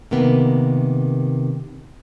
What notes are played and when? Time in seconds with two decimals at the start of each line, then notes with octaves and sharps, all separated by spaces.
0.11 C3 D#3 A#3 B3